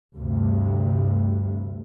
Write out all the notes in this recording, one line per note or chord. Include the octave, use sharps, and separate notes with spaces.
D2 G2 C3